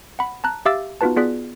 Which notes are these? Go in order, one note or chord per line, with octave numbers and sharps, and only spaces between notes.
F#5 B5
A5 A#5 F#6
G4 E5 F5 D6 E6 A6
B3 D#4 F4 F#4 B4 A5
B3 F4 G#4 D5 F#6 B6